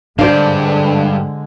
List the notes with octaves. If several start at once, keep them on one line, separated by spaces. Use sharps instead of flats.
G2 D3 G#3 D4 C5 D5 F5